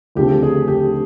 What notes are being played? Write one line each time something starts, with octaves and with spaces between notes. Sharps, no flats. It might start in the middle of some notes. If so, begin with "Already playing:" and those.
D2 C#3 F3 A3 C4 G4
G#4
G4